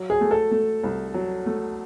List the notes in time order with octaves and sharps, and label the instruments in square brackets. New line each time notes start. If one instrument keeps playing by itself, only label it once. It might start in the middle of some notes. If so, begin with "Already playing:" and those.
Already playing: [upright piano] F#3
[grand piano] G#4
[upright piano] A3
[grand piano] A4
[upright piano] A3
C2
F#3
A3